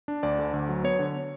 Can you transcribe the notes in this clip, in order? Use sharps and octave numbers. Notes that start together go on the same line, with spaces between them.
D4
D2 D5
D3
D2
F#3
B3 C#5
D3